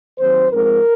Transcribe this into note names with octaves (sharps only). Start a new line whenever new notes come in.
D#2 D#3 F#3 C4 C5
G#2 F3 G#3 C4 A#4